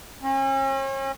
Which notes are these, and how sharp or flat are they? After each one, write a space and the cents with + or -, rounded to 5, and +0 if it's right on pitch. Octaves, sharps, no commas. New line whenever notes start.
C#4 -40